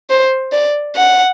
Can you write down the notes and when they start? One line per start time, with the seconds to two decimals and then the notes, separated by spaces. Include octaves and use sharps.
0.10 C5
0.53 D5
0.96 F#5